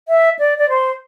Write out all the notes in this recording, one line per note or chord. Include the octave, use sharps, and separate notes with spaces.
E5
D5
D5
C5